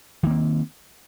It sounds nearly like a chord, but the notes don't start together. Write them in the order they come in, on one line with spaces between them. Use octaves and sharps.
D#3 A#3 C4